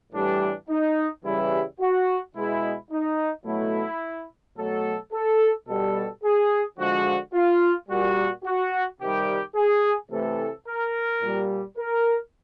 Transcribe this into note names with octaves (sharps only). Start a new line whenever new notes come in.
A2 E3 G3 D4
D#4
C#3 E3 G3 E4
F#4
B2 G#3 E4
D#4
B2 F#3 A3 E4
B2 F#3 A3 A4
A4
B2 G3 A4
G#4
D3 F3 G#3 F#4
F4
A#2 G3 F#4
F#4
C3 D#3 G3 G4
G#4
C3 E3 A3 A4
A#4
A#2 G3
A#4